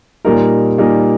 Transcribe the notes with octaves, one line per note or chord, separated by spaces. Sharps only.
A#2 G3 A#3 D#4 A#4
A#2 G3 A#3 D#4 A#4